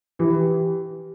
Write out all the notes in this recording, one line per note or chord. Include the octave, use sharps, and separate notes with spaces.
E3 G4
G4